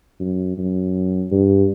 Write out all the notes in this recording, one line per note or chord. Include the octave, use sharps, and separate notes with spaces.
F#2
F#2
G2